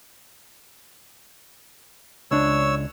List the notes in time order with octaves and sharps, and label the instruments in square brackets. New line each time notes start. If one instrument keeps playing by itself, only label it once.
[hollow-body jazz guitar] C#2 D4 [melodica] C#5 E6